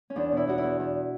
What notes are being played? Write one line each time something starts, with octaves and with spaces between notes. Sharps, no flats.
C#4
E2 D4
B2
E4
E2 F#4
E4
E2
E2